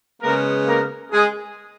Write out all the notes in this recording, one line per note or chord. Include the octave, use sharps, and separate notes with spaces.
C#3 G#3 A#3 B3 A#4
A#3 A#4
G#3 G#4